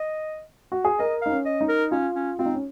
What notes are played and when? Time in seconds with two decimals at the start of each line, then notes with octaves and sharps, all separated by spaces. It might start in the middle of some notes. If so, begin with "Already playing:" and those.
Already playing: D#5
0.72 F#4
0.85 G#4
0.99 A#4 D#5
1.22 D#4 F5
1.30 C#4
1.46 D#5
1.61 D#4
1.69 A#4
1.91 C#4 F4
2.15 C#4
2.39 C4 F4
2.46 D#4
2.54 C#4